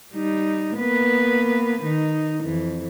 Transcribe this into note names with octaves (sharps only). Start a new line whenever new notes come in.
G3 D#4
A#3 B3 B4
D#3 D#4
F2 E3